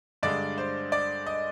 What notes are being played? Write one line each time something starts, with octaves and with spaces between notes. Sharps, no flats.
G2 D3 G#3 D5
C5
D5
D#5